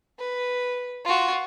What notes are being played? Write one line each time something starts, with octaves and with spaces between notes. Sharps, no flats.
B4
F4 F#4